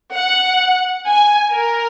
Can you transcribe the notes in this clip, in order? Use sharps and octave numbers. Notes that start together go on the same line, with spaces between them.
F#5
G#5
A#4